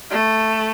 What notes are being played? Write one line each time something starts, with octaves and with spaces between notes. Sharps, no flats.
A3